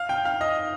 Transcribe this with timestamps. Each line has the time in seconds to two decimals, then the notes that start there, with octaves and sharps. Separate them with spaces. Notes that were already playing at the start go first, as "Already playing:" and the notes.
Already playing: F5
0.09 G5
0.25 F5
0.41 D#5